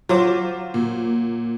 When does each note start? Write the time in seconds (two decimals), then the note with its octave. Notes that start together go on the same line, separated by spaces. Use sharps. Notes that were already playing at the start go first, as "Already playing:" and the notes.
0.09 F#3 F4 C5 D6
0.74 A#2